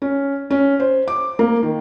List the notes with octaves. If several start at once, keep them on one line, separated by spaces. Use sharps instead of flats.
C#4
C#4
C5
D6
A#3
D#3